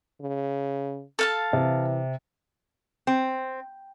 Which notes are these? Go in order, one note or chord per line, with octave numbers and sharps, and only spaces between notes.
C#3
A4 F5 A5
C3 E3
C4